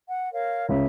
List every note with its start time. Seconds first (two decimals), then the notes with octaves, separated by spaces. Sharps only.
0.07 F#5
0.32 A#4 C#5 F5
0.69 C#2 C#3 E5